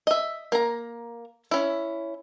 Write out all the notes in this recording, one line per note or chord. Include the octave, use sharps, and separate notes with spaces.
D#5 E5
A#3 A#5
C#4 E4